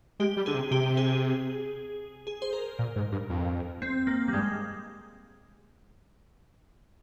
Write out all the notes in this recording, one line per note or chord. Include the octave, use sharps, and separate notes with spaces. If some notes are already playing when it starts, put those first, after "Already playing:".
G#3 G4
G3
D3 G#4
C3
C3 G4
G#4
G#4
C5
A#4
A#2
G#2
G2
F2
C4
A#3
G3
G2 G#3